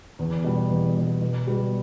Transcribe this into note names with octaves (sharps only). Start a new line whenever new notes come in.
E2
B2 G3
E2
B2 G3
B2
G3 B3 F#4